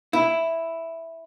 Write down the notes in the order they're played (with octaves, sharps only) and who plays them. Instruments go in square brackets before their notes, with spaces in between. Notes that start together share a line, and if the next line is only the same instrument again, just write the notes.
[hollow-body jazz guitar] E4